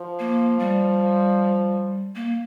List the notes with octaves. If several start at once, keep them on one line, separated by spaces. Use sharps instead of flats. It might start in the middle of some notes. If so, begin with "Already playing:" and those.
Already playing: F3
A#3
G3
A#3